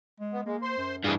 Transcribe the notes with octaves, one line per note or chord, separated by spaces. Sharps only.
G#3
B3
G#3 A#3
C5 C6
F#2
G2 E3 G#4